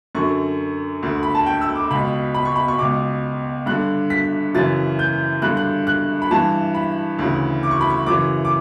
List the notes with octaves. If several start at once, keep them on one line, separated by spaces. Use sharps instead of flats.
F#2 D3 C#6
D2 D3
B5
A5
G5
E6
D6
C#2 B2 B5
B5
C#6
B5
C#6
C#2 B2 D6
G2 D3 F#6
B6
F#2 C#3 E3 A6
G6
G2 D3 F#6
F#6
F#6
B5
G2 E3 A5
B5
D2 C#3 E3
D6
C#6
B5
C#6
F#2 C#3 E3 D6
D6